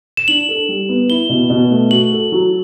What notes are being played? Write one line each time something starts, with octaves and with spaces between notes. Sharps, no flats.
E7
D4 F#7
A4
G3
B3
E4 G7
B2
B2
A3
F#4 F#7
A4
F#3